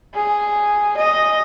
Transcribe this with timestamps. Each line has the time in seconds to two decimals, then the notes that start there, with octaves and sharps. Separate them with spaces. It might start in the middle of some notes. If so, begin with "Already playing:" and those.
0.15 G#4
0.98 D#5